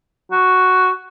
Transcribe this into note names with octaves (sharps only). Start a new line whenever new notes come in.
F#4